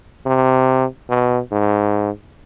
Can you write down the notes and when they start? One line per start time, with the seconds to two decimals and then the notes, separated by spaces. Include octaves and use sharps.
0.26 C3
1.09 B2
1.52 G#2